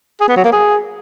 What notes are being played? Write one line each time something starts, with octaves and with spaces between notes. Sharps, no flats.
G#4
B3
F#3
A#3
G#4